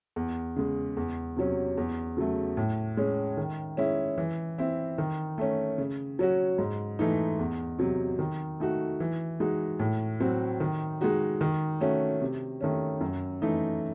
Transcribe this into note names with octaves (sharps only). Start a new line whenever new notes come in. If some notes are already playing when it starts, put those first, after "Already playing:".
E2
C#3 G#3
E2
C3 F#3 C#4
E2
C#3 F#3 A3
A2
G#3 C#4
D#3
G#3 C#4 E4
E3
C4 E4
D#3
A3 C#4
C#3
F#3 C#4 F#4
G#2
E3 A3 D#4
E2
C3 F#3
D#3
A3 D#4 F#4
E3
G#3 D#4 F#4
A2
F#3 C4 F#4
D#3
G#3 D#4 F#4
D#3
A3 C#4 F#4
C3
D#3 A3 C#4
F#2
E3 A3 D#4